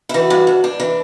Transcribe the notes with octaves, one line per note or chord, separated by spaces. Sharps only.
E4
E3 F#4
G2
G2
D4
E3